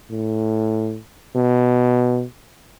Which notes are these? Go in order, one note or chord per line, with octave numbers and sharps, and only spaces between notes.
A2
B2